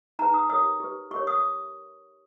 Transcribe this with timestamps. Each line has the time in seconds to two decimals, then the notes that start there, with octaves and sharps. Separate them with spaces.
0.19 D#4 G#4 B4 A#5
0.34 D#6
0.49 G4 A#4 C#5 D#6
0.80 G4 B4
1.11 G4 A#4 C#5 C#6
1.27 D#6